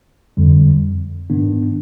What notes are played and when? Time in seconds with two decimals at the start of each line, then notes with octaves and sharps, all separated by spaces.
0.37 F2 D3 G3
1.30 G#2 D#3 B3 D4